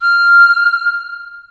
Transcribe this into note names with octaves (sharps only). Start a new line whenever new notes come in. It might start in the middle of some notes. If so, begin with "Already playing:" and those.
F6